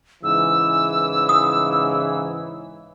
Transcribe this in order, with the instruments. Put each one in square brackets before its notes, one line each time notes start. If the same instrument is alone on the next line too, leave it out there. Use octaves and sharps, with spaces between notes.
[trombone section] G#2 C#3 E3 [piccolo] E6
[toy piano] D#6